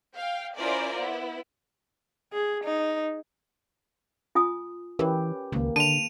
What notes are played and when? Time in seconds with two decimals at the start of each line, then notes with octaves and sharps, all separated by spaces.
0.16 F5 G5
0.56 C#4 E4 F4 A#4 C5 D5
0.96 B3 E4
2.33 G#4
2.64 D#4
4.35 F4 G#5 D#6
4.99 E3 C#4 G4 A#4 B4
5.52 C#2 D#3 A#3
5.76 D3 A5 D#7 F7